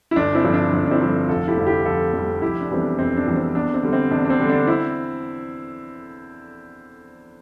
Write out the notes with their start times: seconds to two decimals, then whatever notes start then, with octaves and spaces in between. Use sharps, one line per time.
0.11 E4
0.16 G1 D4
0.35 C4 E4
0.44 G2 F3
0.54 D4
0.72 G1 D4
0.86 D4
0.91 C4 E4
1.01 G2 F3
1.29 F1 F4 A4
1.48 E4 G4
1.57 F2 D3 G3 F4
1.66 E4 G4
1.85 F1 F4 A4
2.13 F2 D3 G3
2.42 F1 E4 G4
2.61 D4
2.70 E2 E3 G3 C4
2.80 D4
2.99 F1 C4
3.17 D4
3.26 E2 E3 G3
3.36 C4
3.55 E2 D4
3.74 C4
3.83 D3 G3
3.93 C4
4.11 E2 D4
4.25 D4
4.30 C4
4.40 D3 G3
4.49 D4
4.67 C4 E4